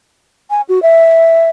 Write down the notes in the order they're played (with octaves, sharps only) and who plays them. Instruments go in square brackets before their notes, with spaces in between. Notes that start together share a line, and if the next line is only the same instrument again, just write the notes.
[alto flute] G#5
F#4
E5